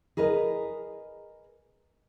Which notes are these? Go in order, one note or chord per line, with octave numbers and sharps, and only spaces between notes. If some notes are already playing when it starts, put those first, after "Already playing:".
G#4 A#4 B4 D#5